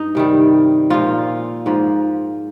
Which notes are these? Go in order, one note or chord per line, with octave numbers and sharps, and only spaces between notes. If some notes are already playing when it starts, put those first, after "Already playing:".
Already playing: G2 D#4
C3 D#3 G3
A#2 F3 F4
G#2 F3